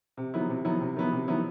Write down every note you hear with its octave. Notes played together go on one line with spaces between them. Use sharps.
C3
D#3 F#3 B3 E4
C3
D#3 F#3 B3 E4
C3
D#3 F#3 B3 E4
C3
D#3 F#3 B3 E4